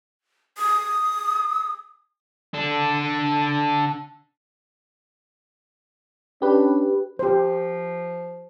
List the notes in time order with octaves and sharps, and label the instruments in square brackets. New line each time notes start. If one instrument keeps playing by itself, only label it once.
[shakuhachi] D#6
[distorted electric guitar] D4 A4
[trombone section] C#4 D4 [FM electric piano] G4 B4
[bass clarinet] F3 [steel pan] G4 C5